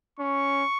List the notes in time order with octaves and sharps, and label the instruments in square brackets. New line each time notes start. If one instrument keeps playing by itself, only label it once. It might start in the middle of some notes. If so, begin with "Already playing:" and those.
[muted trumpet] C#4 [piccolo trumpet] C#6